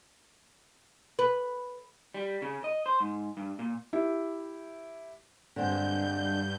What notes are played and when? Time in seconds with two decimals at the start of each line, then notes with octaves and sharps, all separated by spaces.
1.19 B4
2.14 G3
2.42 C#3
2.64 D#5
2.86 C5
3.00 G#2
3.37 G2
3.59 A#2
3.93 E4 G4
5.56 G2 D3 G#3 C4 G6